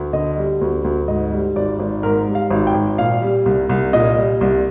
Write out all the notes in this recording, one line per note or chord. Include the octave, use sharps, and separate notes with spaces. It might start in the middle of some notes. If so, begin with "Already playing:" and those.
Already playing: D2
D3 D#5
G3
D2
D2
G#2 D#5
G3
G#1 D5
G#1
G#2 A#4
G3
F5
G#1
G5
G#1
A#2 F5
G3
C2
C2
A#2 D#5
G3
C2